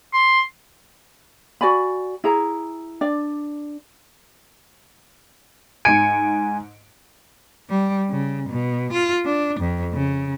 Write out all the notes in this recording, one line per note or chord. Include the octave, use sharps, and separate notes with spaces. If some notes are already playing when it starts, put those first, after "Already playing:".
C6
F#4 D5 G#5 B5
E4 G#4 A#5
D4 D5
G#2 G#5 C#7 D7
G3
C#3
B2
F4
D4
F2
C#3